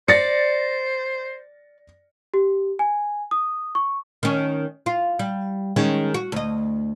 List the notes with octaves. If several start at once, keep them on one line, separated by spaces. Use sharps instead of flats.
C5 D5 A6 A#6 C#7
G4
G#5
D#6
C#6
D#3 C#4
F4
G3
D#3 G#3 C#4
F#4
D2 D#5